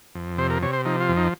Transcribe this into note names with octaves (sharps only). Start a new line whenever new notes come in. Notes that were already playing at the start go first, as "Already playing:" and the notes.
F2
C3 C5
A#4
C3 C#5
C5
F3 D#4
F4
F2
D#4